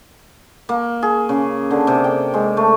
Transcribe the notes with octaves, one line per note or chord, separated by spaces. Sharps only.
A#3
G#4
C#3
D3
C3
G5
G#3
A3